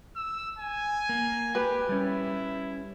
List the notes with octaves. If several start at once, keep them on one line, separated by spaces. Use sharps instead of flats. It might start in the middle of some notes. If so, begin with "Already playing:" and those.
E6
G#5
A#3
G4 B4
G3 C#4 E4